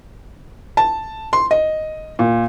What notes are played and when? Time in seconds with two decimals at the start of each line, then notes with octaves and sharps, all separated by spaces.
0.77 A5
1.33 C6
1.51 D#5
2.19 A#2